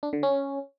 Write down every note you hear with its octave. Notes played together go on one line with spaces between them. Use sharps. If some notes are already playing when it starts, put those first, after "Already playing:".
D4
D3
C#4